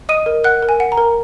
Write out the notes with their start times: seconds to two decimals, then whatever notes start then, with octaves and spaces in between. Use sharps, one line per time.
0.09 D#5 D#6 D#7
0.26 A#4
0.44 A#4 F#5 F#6
0.63 A#4
0.69 G#5
0.80 F#5
0.92 A#5
0.98 A#4